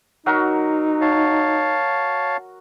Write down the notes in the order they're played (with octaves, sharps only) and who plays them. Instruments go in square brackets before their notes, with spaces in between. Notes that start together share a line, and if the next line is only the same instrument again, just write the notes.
[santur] F#3 F#4 A#4 [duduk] D#4
[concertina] C#5 F5 A5